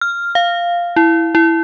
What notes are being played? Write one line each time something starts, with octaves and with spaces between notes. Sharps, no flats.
F6
F5
E4
E4